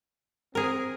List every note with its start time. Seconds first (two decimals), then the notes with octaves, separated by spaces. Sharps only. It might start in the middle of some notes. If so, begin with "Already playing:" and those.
0.55 C4 G#4 A#4